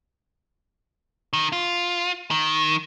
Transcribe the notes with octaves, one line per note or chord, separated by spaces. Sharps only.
D#3
F4
D#3